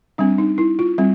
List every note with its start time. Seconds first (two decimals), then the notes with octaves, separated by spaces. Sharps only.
0.18 G3 C4 D4
0.38 D#4
0.58 E4
0.79 F4
0.98 G3 C4